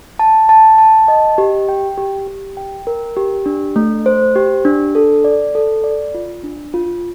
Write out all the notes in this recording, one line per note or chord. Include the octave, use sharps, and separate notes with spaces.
A5
A5
A5
D#5
G4
G5
G4
G4
G5
A#4
G4
D4
A3
C5
G4
D4
A4
D5
A4
D5
F4
D4
F4